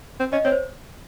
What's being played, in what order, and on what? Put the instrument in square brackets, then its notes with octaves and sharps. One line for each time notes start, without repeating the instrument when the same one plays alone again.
[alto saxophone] C4
[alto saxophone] C#4 [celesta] D#5
[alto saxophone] C4 [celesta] C#5
[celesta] C5